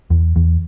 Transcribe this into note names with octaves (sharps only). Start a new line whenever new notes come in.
E2
E2